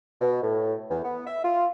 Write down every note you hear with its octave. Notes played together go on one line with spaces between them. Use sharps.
B2
A2
E2
B3
E5
F4